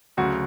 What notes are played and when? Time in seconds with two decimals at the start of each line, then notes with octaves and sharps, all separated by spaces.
0.17 D2 C#3 F#3 F#4